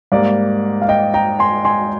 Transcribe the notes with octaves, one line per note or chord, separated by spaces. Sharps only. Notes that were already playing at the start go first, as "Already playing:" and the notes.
G#2 G3 A#3 D5 F5
F5
D#5 G5
G5 A#5
G#5 C6
G#5 C6